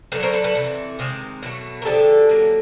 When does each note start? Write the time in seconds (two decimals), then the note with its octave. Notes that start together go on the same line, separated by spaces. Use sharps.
0.12 D3 F#3 A3 A4 B4
0.23 A#4 C5
0.33 A4 B4
0.44 A4 B4
0.55 C3 E3 A3
0.99 C3 D#3 G#3
1.43 B2 F#3 A3
1.82 A#4
1.85 D3 F3 G#3 G4 A4
2.29 D3 F#3 A#3